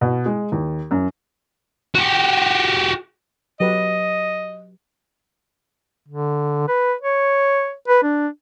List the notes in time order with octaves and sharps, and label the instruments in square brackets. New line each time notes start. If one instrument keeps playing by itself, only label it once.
[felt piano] B2
G#3
D#2
F#2
[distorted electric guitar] F#4 G4
[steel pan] F#3 G4 B4 [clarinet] D#5
[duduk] D3
B4
C#5
B4
D4